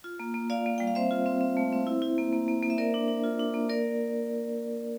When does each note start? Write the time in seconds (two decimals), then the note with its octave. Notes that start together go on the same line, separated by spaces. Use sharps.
0.04 F4
0.20 A#3
0.34 A#3
0.50 F4 D5 F5
0.66 A#3
0.78 G3 G5
0.87 F5
0.95 C4 C5 E5
1.11 F4
1.26 C4
1.41 C4
1.57 A3
1.72 C4
1.87 E4
2.02 E4
2.18 A#3
2.33 A#3
2.48 A#3
2.63 A#3
2.70 E5
2.78 A#3 A#4 D5
2.94 D4
3.08 D4
3.24 F4
3.39 D4
3.54 A#3
3.69 A#3 A#4 D5